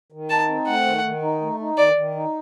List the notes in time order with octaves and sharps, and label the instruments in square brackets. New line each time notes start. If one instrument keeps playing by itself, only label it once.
[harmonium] D#3
[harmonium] D#4 [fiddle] A5
[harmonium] C4
[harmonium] A3 [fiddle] F#5
[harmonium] D#3
D#3
D#4
A3
D#4
[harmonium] D#3 [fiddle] D5
[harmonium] D#3
D#4